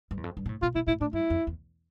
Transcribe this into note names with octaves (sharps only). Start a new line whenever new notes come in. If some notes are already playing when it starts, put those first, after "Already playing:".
G2
E2
F2
G2
B2
A2
B2 F4
B2 E4
A2 E4
A2 D4
G2 E4
F2
E2